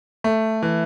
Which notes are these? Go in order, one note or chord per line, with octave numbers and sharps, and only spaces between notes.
A3
E3